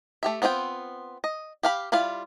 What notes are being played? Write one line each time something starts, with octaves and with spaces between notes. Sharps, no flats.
A3 G4 E5
B3 C4 F4 D#5 G5
D#5
G4 F5 B5
G3 E4 F4 F5